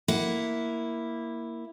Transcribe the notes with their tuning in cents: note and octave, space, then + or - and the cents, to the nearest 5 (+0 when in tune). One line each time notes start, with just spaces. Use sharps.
A#3 +0 E4 +0 F#5 +0